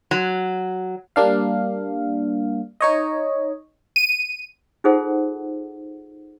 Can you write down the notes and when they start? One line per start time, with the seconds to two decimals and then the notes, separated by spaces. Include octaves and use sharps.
0.11 F#3
1.16 G3 A#3 D4 F5
2.81 D#4 C#5 D#5
3.96 D#7
4.84 D#4 F4 G#4 A4 C5 F#5